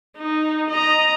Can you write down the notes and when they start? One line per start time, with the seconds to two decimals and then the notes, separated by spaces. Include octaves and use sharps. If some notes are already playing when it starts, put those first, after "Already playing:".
0.17 D#4
0.70 D#5 A#5